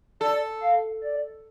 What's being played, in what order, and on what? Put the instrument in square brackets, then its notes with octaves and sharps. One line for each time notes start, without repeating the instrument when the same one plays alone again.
[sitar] A4 [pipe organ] D5
[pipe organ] F5
D5